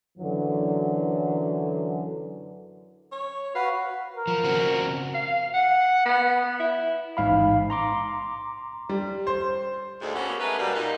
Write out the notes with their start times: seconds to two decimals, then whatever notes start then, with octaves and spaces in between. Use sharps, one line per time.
0.18 F#2 D3 E3 F#3
3.12 C#5
3.55 F#4 B4 F5
4.15 A#4
4.27 F3
4.44 C#3 C4 F#4
5.14 F5
5.54 F#5
6.05 B3
6.60 E4
7.17 A1 G#2 F5 B5
7.70 A#5 C6 D6
8.89 G3
9.27 C5
10.02 D2 G#2
10.15 A#3 B3 C#4 F#4 G4 A4
10.40 G#3 A3 A#4 B4
10.59 B2 G3 A#3
10.75 A#2 D#4